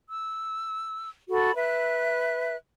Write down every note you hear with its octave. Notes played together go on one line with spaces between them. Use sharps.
E6
F#4 A4 B5
B4 E5 F#6